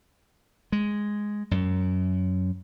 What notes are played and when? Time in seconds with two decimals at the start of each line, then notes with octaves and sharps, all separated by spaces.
0.72 G#3
1.51 F#2